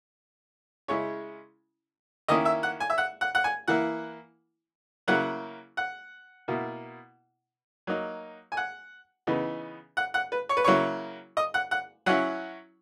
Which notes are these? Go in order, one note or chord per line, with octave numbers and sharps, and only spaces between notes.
C#3 G#3 C#4 E4 C#5
D#3 A#3 C#4 E4 D#5
E5
F#5
G#5
E5
F#5
F#5
F#5
G#5
E3 A#3 E4 F#5
C#3 F#3 A#3 E4 F#5
F#5
B2 A#3 E4
F#3 A#3 D#4
G#5
F#5
C#3 E3 B3 D#4
F#5
F#5
B4
C#5
B4
C#3 F#3 A#3 E4 C#5
D#5
F#5
F#5
F#3 C#4 E4 F#5